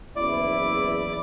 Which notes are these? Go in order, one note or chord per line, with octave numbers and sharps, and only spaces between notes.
F#1 E2 E4 D5